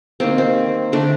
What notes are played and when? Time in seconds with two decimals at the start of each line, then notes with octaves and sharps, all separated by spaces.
0.20 D#3 G3 A#3 C4
0.38 C4
0.92 D3 A3 D4